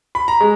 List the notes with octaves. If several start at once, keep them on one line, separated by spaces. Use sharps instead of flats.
B5
A#5
G#3